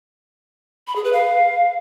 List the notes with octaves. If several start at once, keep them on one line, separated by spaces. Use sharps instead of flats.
B5
G#4
B4
F5